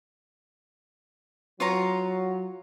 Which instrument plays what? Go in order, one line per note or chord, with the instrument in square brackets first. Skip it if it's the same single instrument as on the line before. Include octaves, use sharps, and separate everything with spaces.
[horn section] F#3 [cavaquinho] F4 C#5 A#5